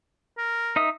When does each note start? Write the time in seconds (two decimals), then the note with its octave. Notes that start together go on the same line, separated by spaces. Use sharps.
0.38 A#4
0.76 D#4 E5 D#6